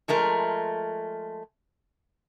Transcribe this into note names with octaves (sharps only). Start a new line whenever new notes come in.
F3 G#3 A3 A#4